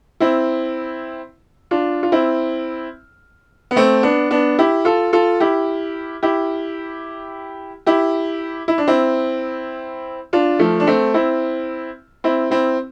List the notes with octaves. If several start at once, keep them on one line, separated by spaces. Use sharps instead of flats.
C4 E4
D4 F4
F4
C4 E4
B3
A3 C4
B3 D4
B3 D4
E4 G4
F4 A4
F4 A4
E4 G4
E4 G4
E4 G4
E4
D4
C4 E4
D4 F4
F3 A3
D4
A3 C4
C4 E4
C4 E4
C4 E4